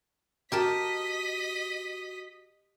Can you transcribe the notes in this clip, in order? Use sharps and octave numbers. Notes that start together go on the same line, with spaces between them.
F#4 G4 A#4 D#5 A5 B6